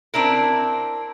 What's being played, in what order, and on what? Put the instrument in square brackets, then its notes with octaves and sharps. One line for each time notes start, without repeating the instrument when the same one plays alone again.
[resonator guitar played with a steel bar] C4 D4 E4 A#4